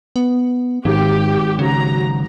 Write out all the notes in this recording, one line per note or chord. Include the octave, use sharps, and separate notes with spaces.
B3
G#1 G#2 G4
C#3 F#3 A#5